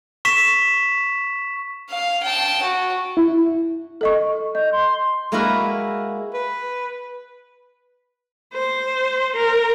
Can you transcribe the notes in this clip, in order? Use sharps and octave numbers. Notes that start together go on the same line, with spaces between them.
C#6 B6 E7
F5
G5 A5
F#4
E4
A4 D#5 C#6
D#5 G6
C6
G#3 A#3 E4 F#4 A#4 B4
B4
C5
A#4